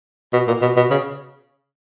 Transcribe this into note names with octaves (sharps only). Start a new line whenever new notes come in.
B2
A#2
B2
B2
C#3